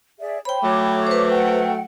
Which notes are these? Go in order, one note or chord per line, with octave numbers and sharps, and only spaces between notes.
G#4 D5 E5
C5 C#5 G5 B5
F#3 A3 C#5 D6
B4 C5
F#5 G5